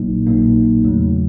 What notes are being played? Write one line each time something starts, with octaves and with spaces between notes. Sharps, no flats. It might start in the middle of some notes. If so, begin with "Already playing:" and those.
Already playing: A#1 A#2 F#3 A#3 D#4
A#1 A#2 F#3 A#3 D#4
E2 C#3 F#3 A3